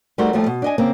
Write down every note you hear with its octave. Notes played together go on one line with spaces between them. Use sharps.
G3 A3 D#4 F#4 A#4 C5
D#2 F3 G3 A3
B2
D4 D#5 G#5
C#3 A#3 C4